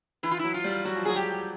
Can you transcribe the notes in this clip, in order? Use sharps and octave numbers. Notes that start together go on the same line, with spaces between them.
E3 E4
F4
F#3 E4
F4
G3
F#3 F#4
F3
F#3 G#4
G4